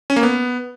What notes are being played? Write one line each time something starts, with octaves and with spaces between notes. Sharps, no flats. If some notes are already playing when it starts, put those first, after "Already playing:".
C#4
A#3
B3